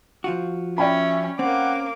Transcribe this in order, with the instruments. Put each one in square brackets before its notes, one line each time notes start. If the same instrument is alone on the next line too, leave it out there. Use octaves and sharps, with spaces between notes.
[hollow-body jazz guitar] F3 F4 F#4
[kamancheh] C#4 [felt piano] D5 G5 B5 [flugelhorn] E5
[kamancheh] A#3 D6 [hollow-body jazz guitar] C4 C#4 [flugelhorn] F#5